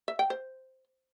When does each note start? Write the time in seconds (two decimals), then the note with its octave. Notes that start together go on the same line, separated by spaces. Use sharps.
0.08 E5
0.19 G5
0.30 C5